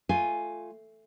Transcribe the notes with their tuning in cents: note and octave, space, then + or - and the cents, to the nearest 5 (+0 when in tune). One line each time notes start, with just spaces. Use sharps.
A3 +0 F4 +0 G#5 +0